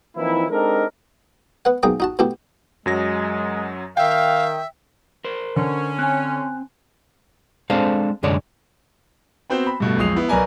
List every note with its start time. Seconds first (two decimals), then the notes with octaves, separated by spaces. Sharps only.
0.17 E3 F3 A#3 C4 D#4 E4
0.51 G#3 C4 D4 D#4 A4 A#4
1.65 B3 B4 F#5
1.83 B1 A#3 G#4 G5 D#6
2.00 D#4 F#4 A5
2.19 B2 A3 E4 G4
2.86 F#2 F#3 G#3 A#6
3.97 D#3 E5 F5 G5
5.24 A#4 C5
5.56 D3 C#4
5.99 C4 G#5 F#6
7.70 G#3 C4 D4 A4 C5 F5
8.23 C2 F#2 D3 G#3 C#5 D5
9.50 B3 C4 F#4 C5
9.67 B5
9.80 G2 B2 A3
9.97 B1 F2 G#3 D#6 C7 F7
10.16 B3 E4
10.28 B1 A#4 B4 D5 G#5 A#5